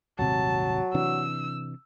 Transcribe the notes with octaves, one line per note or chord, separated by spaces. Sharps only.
D#1 G#1 C3 F#3 A5
C3 E3 D4 E6